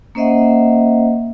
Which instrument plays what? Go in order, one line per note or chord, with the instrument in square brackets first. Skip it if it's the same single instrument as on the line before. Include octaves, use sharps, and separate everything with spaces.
[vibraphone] A#3 C#4 C5 D#5 E5 F#5